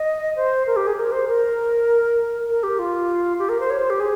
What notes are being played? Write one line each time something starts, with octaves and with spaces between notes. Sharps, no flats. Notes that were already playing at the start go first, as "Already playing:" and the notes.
Already playing: D#5
C5
A#4
G4
G#4
A#4
C5
A#4
A#4
G4
F4
G4
A#4
C5
C#5
C5
G4
G#4